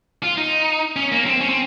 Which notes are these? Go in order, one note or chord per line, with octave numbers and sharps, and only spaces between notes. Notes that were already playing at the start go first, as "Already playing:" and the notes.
F4
D#4
C#4
A#3
C4
C#4
C4